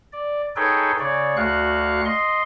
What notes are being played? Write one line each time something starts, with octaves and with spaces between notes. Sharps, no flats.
D5
D#4 G#4 A4 B4 C#5 G5
C#3 C#5 D5
D2 F#4 F5 F#6
D#5 C6